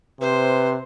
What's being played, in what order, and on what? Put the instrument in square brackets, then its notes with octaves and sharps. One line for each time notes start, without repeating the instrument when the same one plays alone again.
[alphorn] C3 [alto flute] B4 [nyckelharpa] C5